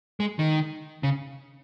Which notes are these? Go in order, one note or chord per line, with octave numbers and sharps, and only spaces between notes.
G#3
D#3
C#3